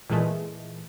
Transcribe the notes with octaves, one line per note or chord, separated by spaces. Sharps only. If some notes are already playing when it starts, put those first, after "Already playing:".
A#2 E3 G#3 A3